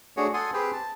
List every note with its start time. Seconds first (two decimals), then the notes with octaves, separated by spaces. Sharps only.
0.17 A3 D4 F#4 G#4 C#5
0.34 A4 F#5 G#5 C6 D#6
0.54 C4 G4 G#4 B4 C5 G5
0.73 A5